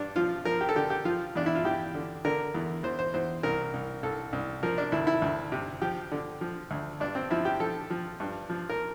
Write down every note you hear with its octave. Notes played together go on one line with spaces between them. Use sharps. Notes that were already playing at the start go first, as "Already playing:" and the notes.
Already playing: G2 D4
F3 F4
F3 A#4
G4
A4
D3 G4
G4
F3 F4
E2 D4
E4
F4
E2 G4
D3
D3 A#4
E2
E2 C5
C5
E2 C5
C2 A#4
C2
C2 A4
C2
F3 A#4
D4
D2 E4
E4
D2
C3
F3 G4
D3
F3
D2
G2 D4
C4
F3 E4
G4
F3 A4
F3
G2
F3
A#4